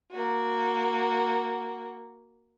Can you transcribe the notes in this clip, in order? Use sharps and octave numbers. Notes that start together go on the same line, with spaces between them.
A#3 F#4